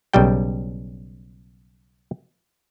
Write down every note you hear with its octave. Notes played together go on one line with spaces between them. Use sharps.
B1 C#3 G3 G5